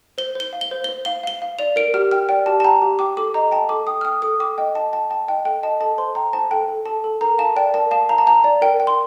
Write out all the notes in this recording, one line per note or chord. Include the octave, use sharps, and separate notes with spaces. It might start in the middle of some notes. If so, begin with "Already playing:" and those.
C5 G7
C5 G7
F5
G7
C5
C5 G7
F5 G7
F5 G7
F5
D5 F7
A#4 D7
G4 F6
G5 F6
D5 G5
G4 A5
A5
G5 A#5
G4
G5 D6
A4 D6
D#5 A#5
G5 A5
A4 D6
G5 D#6
F6
G5 D#6
A4 D#6
G5 D6
D#5 G5
D#5 A5
G5 A5
G5 A5
D#5 G5
A4 G5
D#5 A5
A4 A5
C5 C6
G5 A#5
C5 A5
A4 G5
A4
A4 A5
A4
A#4 A#5
F5 A5
D5 G5
A#4 A5
F5 A5
F5 A#5
A5
F5 A#5
D5
A#4 G5
G5
C6